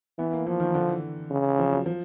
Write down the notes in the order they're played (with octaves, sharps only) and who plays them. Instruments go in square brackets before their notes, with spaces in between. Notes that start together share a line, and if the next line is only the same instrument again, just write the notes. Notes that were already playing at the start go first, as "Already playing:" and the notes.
[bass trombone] E3 [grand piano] B3
[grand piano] A#3
[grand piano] E3 [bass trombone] F3
[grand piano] D#3
D3
E3
[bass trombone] C#3
[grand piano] F3
F#3
F3